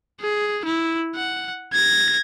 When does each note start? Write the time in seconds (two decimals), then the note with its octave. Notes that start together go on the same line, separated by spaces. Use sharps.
0.21 G#4
0.65 E4
1.15 F#5
1.73 G#6 A#6